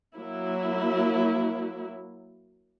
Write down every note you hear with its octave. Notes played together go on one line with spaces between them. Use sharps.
F#3 A#3 E4